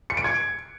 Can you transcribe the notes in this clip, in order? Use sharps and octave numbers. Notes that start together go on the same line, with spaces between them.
C#7
D7
G#6